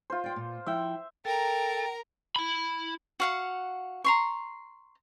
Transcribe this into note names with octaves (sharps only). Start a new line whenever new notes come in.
F4 C5
D5 G5
A#2
F3 E4 E5 G5
A4 A#4 G5 A#5
E4 B5
F#4 F5 F#5
A#5 C6 C#6